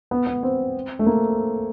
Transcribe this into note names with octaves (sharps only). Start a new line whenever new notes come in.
B3
B3
C4
A3
A#3